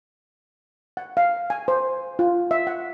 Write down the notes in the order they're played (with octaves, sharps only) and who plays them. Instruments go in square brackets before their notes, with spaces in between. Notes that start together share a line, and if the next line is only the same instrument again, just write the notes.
[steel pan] F#5
F5
G#5
C5
F4
E5
F#5